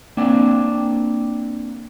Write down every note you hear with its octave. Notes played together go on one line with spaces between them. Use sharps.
A#3 C4 D4